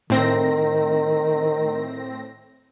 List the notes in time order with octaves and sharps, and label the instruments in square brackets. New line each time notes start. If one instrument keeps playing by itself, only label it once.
[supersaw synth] A2 C4 A#6 [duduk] D#3